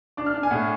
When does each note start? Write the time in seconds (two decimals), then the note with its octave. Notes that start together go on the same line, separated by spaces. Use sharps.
0.17 D4 D6
0.26 F6
0.34 D4
0.43 G#5
0.50 A2 F#5